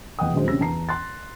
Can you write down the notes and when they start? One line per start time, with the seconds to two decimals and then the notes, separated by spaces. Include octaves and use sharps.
0.19 F1 E2 D#5 F#5 G5 D#6
0.33 D#1 D2 F#3 G#3 C5
0.47 A#1 C3 C#4 G4 E6 A#6
0.60 E2 A5 A#5 C7
0.89 C6 F#6 A6